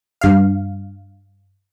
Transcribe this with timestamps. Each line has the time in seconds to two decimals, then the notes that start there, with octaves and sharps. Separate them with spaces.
0.21 G2 F5